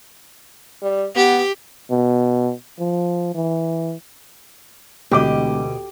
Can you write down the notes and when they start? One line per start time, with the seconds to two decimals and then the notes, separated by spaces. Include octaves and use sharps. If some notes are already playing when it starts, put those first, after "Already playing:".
0.82 G3
1.16 B3 G4
1.91 B2
2.79 F3
3.35 E3
5.11 E1 D2 B2 G4 D#5 D6